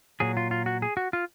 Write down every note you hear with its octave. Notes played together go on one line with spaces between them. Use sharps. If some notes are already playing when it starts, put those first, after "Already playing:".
A#2 F#3 G#4
F4
F4
F#4
G#4
F#4
F4